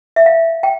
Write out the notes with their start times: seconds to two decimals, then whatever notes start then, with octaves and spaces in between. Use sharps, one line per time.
0.16 E5
0.26 F5
0.63 G5